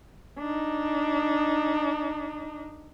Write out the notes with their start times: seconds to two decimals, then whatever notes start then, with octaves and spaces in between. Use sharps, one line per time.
0.39 D4 D#4